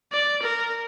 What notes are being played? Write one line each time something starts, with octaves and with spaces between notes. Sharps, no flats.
D5
A#4